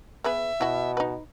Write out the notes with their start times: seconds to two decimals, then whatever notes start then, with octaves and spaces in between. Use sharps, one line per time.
0.24 B3 G#4 B4 E5
0.61 B2 E4 F#4
0.97 D#4 B4